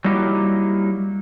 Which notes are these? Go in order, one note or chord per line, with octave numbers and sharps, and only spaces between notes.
F#3 G3 A#3 D#4 E4 G4